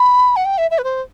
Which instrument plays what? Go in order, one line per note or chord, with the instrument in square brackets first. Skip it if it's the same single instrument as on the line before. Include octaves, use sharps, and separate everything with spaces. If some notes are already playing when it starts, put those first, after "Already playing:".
Already playing: [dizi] B5
F#5
G5
E5
E5
B4
C5